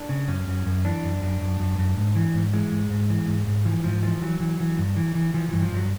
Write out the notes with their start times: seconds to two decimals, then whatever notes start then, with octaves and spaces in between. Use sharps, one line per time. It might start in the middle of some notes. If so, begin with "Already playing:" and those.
Already playing: D4
0.09 C#3
0.28 F#2 C#4
0.47 F#2
0.66 F#2
0.85 E3 D4
1.03 F#2
1.22 F#2
1.40 F#2
1.60 F#2
1.78 F#2
1.97 G#2
2.16 E3
2.34 G#2
2.53 E3 G#3
2.72 G#2
2.90 G#2
3.10 E3
3.28 G#2
3.47 G#2
3.65 E3 F3
3.84 G#2 F3
4.02 E3 F3
4.21 E3 F#3
4.40 E3
4.60 E3
4.78 G2
4.96 E3
5.15 E3
5.34 E3 F3
5.49 G2 E3
5.62 F3
5.72 G2
5.77 F#3